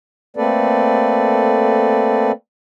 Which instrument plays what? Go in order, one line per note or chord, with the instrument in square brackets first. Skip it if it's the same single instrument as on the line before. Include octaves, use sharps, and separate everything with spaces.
[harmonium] A3 A#3 C4 A4 B4 D5